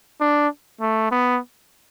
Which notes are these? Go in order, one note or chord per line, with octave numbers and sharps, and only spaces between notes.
D4
A3
B3